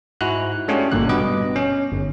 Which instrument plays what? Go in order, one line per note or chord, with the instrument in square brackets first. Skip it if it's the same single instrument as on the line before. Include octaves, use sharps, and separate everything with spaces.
[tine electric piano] G#2 G#3 E4 F#4 F#6
G#3 A3 C#4 D4 F#4 G4
G1 G2 A#2 D3 F#6
G2 B2 B3 D#5 D6
C#4
G1